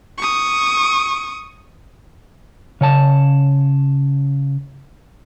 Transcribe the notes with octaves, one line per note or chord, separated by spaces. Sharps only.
C#6 D#6
C#3 C#5 A5